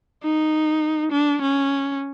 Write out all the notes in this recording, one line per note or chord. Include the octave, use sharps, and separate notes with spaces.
D#4
D4
C#4